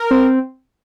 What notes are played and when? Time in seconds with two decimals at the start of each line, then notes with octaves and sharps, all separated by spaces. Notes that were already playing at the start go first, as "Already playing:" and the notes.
Already playing: A#4
0.11 C4